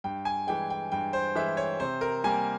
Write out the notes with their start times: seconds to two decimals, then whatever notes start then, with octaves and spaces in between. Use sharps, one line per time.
0.04 G2 G5
0.25 G#5
0.47 E3 G#3 G5
0.70 G5
0.92 G2 G5
1.13 C5
1.35 E3 G#3 E5
1.57 C#5
1.80 C3 C5
2.01 A#4
2.24 G3 A#3 G#5